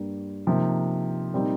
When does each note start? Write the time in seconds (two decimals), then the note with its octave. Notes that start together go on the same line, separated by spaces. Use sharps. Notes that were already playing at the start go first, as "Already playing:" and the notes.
Already playing: G2 G3 A#3
0.47 C3 F3 A#3 D#4
1.33 A#2 G3 C4 D#4